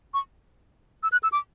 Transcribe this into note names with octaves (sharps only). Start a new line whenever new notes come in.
C#6
E6
F#6
E6
D6